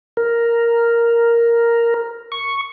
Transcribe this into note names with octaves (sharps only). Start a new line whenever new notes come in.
A#4
C#6